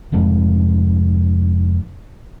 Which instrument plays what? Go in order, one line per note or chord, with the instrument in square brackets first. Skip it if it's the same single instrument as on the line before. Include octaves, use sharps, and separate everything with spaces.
[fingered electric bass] F1 F2 G#2